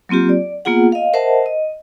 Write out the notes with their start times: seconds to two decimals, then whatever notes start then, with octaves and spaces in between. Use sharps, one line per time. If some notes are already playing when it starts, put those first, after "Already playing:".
0.09 F#3 A#3 C4 F4 G4
0.29 D5
0.65 A#3 B3 F4 G#4 F#5
0.92 D#5 F5
1.14 A#4 C5 D#5 E5 F#5 A5
1.46 D#5